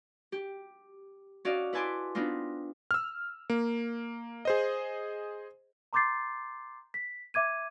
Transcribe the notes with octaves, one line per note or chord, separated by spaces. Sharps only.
G4
C#4 F#4 D5 D#5 F5
E4 B4 G#5 A5 C6 D6
B3 C4 D4 D#4 F4
E6 F6
A#3
G#4 C5 D#5
A#5 C6 D6 G6 A6 C7
B6
E5 D6 G#6 D#7